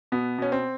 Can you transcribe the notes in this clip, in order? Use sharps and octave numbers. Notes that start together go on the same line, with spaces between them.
B2 B3
B2 C#4
C4